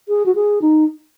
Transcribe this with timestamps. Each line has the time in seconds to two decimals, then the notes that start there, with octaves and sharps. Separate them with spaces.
0.08 G#4
0.26 F#4
0.35 G#4
0.62 D#4